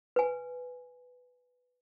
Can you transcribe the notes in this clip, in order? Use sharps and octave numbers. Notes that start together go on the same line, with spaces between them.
B4 G#5